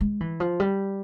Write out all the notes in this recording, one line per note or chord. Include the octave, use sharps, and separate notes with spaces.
G#3
E3
F3
G3